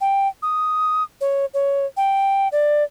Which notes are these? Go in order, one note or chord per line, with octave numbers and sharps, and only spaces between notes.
G5
D#6
C#5
C#5
G5
D5